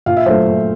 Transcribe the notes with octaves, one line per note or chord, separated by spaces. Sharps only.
A#2 F5
E5
F#3 A3 C5
A#2